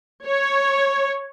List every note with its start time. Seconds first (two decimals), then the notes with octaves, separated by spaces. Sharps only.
0.24 C#5